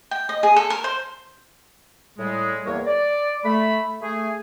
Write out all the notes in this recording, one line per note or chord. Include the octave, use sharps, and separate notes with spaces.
G5
D#5
G#4
A4
A#4
C5
A2 G3 G#3
E2 A#3 B3 A#4 C#5
D5
A3 B5
A3 G#4